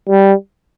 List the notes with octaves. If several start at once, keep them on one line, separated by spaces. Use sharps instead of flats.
G3